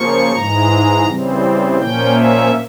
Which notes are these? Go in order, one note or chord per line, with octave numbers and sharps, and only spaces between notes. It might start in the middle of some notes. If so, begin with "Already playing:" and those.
Already playing: C#3 F3 A#3 C#6
G#2 E3 G#3 A#5
C#3 E3 G3 C4
A#2 F3 A#3 C#4 G5
E5